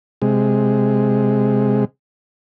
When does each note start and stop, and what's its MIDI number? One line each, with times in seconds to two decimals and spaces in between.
0.22 1.85 48
0.22 1.85 56